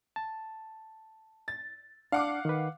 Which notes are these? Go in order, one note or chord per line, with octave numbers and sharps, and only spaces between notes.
A5
A6
D4 F5 F#5 D6
D#3 B4